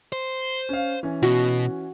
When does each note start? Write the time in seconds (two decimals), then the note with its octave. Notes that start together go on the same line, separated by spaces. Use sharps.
0.12 C5
0.69 C#4 F5
1.03 E3 C#4
1.23 B2 F#4